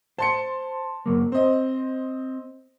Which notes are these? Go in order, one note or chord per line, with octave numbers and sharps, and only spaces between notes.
C5 A5 C6 C#7
F#2 F#3 A#3
C4 C5 D#5